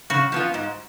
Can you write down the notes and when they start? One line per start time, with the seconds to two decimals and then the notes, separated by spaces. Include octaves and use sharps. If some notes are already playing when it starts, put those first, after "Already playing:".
0.10 C#3 F#4
0.32 F3 B3 F4
0.54 G#2